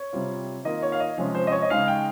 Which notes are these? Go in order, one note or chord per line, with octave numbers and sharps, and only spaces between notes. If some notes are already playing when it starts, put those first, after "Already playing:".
Already playing: C#5
C3 G3 C4 F4
D#3 A#3 F4 D#5
C#5
F5
D#5
C3 F3 G#3 C#4
C5
D#5
C#5
D#5
C#3 G#3 D#4 F5
G5